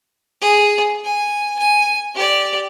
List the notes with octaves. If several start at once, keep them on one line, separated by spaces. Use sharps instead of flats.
G#4
G#5
G#5
G4 D5